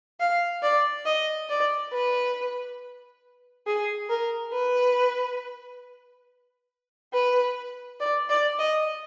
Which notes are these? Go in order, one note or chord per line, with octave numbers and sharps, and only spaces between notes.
F5
D5
D#5
D5
B4
G#4
A#4
B4
B4
D5
D5
D#5